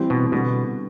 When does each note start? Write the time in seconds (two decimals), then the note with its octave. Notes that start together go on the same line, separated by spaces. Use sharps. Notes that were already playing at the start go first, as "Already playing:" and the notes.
Already playing: E3 G3 C4 G4
0.10 B2
0.32 B2 D3 G3 B3